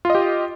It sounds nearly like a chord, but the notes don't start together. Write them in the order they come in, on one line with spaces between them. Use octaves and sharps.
F4 D#5 G4